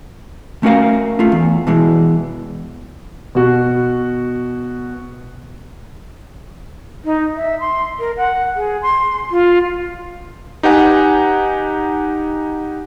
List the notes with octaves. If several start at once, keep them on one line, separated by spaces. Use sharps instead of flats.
A3 C#4 F#4 A#4 F5
A3 F4
E2
B2 E3 G#3
B2 F#4
D#4
E5
C6
A#4
F#5
G#4
C6
F4
D#4 G4 B4 F#5 G#5